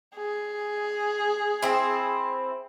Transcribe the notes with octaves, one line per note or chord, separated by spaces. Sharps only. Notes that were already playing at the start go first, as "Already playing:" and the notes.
G#4
C4 E4